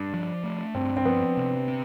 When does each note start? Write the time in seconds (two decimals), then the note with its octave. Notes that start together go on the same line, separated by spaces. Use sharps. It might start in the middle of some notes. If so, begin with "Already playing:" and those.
Already playing: G2 D4
0.14 F3
0.44 A3
0.75 G2 C4
0.97 C4
1.05 F3 B3
1.37 C3
1.68 C4